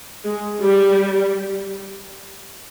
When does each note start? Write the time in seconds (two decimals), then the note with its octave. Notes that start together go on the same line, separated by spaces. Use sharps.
0.24 G#3
0.62 G3